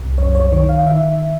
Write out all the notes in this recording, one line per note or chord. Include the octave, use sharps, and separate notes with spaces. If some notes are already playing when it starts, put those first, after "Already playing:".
Already playing: C2 C3
F#2 C#5
C#5
D#3 C#5
F5
D#3 E5